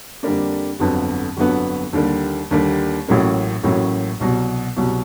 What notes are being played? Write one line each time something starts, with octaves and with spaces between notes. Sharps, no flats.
F2 D3 G3 A#3 D4
G1 F2 D3 F#3 B3
G1 F2 D3 F#3 B3
D#2 D3 G3 A#3
D#2 D3 G3 A#3
A1 A2 F#3 A#3 C#4
A1 A2 F#3 A#3 C#4
C2 B2 F#3
C2 B2 F#3